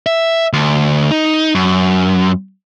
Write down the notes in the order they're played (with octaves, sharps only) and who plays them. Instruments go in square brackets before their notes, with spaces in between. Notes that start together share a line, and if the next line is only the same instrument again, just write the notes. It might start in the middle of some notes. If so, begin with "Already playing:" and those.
[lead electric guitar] E5
D2
D#4
F#2